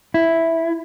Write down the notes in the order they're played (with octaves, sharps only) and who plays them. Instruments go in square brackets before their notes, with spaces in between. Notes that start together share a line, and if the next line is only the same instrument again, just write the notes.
[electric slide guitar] E4